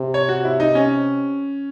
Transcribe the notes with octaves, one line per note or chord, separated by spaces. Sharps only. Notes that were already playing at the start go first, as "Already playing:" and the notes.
Already playing: C3
C#5
F#4
E4
D#4
C#4